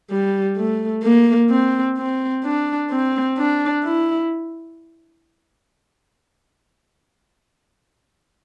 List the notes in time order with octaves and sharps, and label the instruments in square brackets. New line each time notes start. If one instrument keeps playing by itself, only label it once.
[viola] G3
A3
A#3
C4
C4
D4
C4
D4
E4